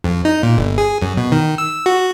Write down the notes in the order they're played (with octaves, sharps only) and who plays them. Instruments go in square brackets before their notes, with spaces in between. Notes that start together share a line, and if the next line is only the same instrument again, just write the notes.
[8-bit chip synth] F2
D#4
A#2
G1
G#4
F#2
B2
D#3
E6
F#4